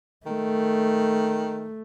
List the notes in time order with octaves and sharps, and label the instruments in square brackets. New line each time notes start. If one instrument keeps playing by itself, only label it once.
[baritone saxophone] D#3 [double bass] A3